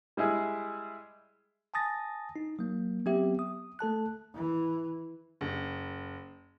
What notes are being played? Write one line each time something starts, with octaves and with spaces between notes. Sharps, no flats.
G3 G#3 E4 G#4
G#5 A5 D#6 A6 A#6
D#4
F#3 A#3
F#3 B3 C4 G4 E5
D#6
A3 A4 A5 F#6
E3
F#1